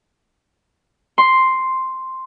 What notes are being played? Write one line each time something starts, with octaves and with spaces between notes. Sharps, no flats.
C6